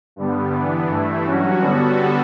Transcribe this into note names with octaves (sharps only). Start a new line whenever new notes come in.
G2 D3 G3 B3
E3 B3 D4
G2 E3 A3 E4
G2 F#3 C#4 F#4
D3 G3 B3 F#4 A4